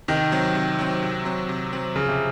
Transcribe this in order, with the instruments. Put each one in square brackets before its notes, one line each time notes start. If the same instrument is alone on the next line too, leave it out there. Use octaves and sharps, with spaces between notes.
[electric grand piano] C3 [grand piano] D#3
[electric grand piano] F#3 C4
C3
F#3 C4
C3
F#3 C4
C3
F#3 C4
[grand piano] C#3 [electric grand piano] F3
[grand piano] C3